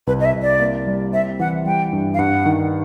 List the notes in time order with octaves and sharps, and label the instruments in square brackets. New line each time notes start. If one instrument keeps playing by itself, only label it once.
[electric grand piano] C2 [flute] B4
[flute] D#5
E5
[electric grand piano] C2
[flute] D5
[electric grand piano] A#3
G3
[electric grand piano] C4 [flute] E5
[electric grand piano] E3 [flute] F#5
[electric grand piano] G3 [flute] G5
[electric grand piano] G2
[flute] F5
[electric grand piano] G2 [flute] F#5
[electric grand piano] D#3